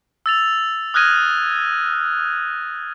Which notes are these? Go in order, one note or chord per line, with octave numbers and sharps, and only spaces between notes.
E6 A6 F7
D#6 F6 F#6 G#6 A#6 D#7